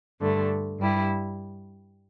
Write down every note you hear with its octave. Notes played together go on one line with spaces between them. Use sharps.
G2 D3 A3
G2 G3 E4